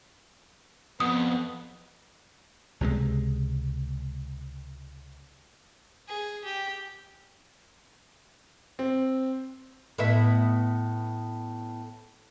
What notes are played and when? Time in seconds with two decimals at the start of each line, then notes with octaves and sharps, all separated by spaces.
1.00 F2 B3 D#6
2.81 C#2 C3 F#3 G#3
6.08 G#4
6.44 G4
8.79 C4
9.98 A2 B3 E5